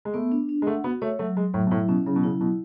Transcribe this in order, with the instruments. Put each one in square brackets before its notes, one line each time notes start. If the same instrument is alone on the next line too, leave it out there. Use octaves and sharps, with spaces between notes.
[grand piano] G#3
[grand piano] A3 [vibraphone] B3
[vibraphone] D4
D4
[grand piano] G#3
[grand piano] A3 [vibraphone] F#5
[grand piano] B3 [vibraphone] F#4
[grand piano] A3 [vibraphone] C#5
[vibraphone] F#3 [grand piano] A3
[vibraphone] F#3 [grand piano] G#3
[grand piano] A2 [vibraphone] F#3
[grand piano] B2
[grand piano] A2 [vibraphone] E4
[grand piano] B2 [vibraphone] C#4
[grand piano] C#3 [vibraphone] F#3
[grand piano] B2
[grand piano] C#3 [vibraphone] E4
[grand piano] B2 [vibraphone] E4